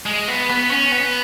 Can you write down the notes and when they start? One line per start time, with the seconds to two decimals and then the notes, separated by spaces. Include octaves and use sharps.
0.06 G#3
0.28 B3
0.50 B3
0.71 C#4
0.92 B3